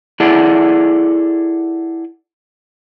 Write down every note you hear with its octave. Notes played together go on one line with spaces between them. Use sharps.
E4 G#4 A4 D5 F#5